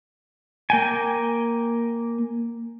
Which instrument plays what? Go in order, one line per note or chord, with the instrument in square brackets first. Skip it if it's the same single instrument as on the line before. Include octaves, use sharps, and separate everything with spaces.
[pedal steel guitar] A#3 G5 G#5